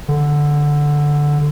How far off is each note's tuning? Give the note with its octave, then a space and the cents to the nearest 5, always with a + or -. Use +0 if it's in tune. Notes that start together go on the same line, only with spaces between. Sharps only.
D3 +0